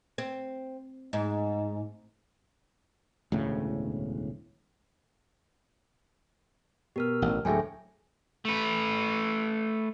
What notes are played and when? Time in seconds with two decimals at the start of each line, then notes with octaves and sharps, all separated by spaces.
0.18 C4
1.13 G#2
3.32 E1 D2 A2 C#3
6.96 B2 G4 A#4 F6
7.22 A1
7.45 D2 A2 F#3 G#3 A3 E5 G5 G#5
8.45 A3 B4